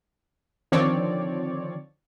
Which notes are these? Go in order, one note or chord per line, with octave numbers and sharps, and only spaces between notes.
D3 D#3 F3 C4 C#5 D5